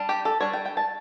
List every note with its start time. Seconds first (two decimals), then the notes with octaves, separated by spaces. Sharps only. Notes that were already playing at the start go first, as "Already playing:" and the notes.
Already playing: G3 D4
0.09 G4
0.25 A4
0.40 G3 D4 C#5
0.53 G5
0.65 G5
0.77 A5